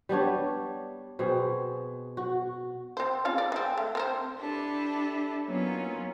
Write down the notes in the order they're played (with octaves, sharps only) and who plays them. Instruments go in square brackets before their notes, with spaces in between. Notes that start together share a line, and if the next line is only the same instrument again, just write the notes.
[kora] G3 B3 D4 C#5
B2 C4 G#4
F#4
[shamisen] C4 C5
C#3 F4 F5
D5
G#3 C4
A3
C4 A#4 C5
[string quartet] D4 E4 G4 A4 B4
F#3 A#3 B3 C#4 D#4 F4